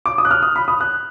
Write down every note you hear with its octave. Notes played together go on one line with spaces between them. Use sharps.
D6
D#6
F#6
F6
D#6
B5
D#6
F#6